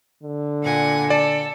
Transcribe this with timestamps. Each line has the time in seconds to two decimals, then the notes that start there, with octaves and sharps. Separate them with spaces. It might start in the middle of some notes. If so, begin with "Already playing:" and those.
0.23 D3
0.63 A#2 F#5 G#5
1.10 A4 D5